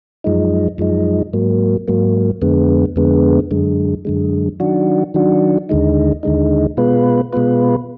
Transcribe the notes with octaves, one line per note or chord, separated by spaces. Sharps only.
F#2 F3 G#3 D#4
F#2 F3 G#3 D#4
G#2 F#3 A#3
G#2 F#3 A#3
F2 D3 G#3 B3
F2 D3 G#3 B3
F#2 D3 G#3
F#2 D3 G#3
D#3 F#3 D4 F#4
D#3 F#3 D4 F#4
D#2 D3 G#3 D#4
D#2 D3 G#3 D#4
B2 G#3 B3 F4 B4
B2 G#3 B3 F4 B4